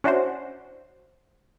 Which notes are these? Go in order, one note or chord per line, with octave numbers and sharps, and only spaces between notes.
C#4 D4 E4 F#4 C5